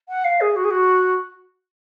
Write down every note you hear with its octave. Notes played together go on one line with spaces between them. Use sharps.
F#5
F5
G#4
F#4
G#4
F#4